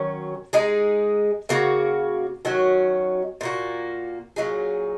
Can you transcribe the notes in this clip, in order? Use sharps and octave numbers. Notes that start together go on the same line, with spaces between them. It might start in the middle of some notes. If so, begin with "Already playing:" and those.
Already playing: D#3 F#3 C#4
G#3 D#4 G#4
C#3 A#3 F#4
D#3 F#3 C#4 F#4
A#2 A#3 F#4
A#2 F#3 D#4 G#4